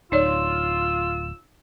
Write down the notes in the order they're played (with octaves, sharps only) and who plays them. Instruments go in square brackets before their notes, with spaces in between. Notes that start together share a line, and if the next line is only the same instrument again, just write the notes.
[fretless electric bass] D1 [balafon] D#4 C#5 D5 [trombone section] F4 [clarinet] E6